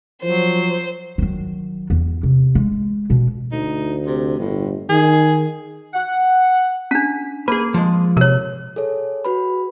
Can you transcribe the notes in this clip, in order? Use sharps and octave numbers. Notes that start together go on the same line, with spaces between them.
F3 F#3 C5
D#3 F#3
E2
C3
G#3
B2
D2 D#4
C3
G1 A2
D#3 G#4
F#5
C#4 D4 B6
A#3 G#4 B4
F3 G#3
C3 A#4 C#5
G#4 A4 C#5
F#4 B4 B5